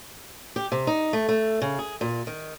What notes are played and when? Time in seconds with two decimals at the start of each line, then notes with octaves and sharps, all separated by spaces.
0.56 G4
0.72 C3
0.87 D#4
1.13 A3
1.29 A3
1.62 C#3
1.79 G#4
2.01 A#2
2.27 D#3